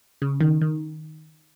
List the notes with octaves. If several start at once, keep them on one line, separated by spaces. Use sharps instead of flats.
C#3
D#3
D#3